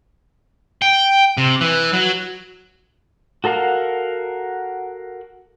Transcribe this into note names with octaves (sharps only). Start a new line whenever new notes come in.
G5
C3
E3
F#3
F#4 A4 A#4 F5 F#5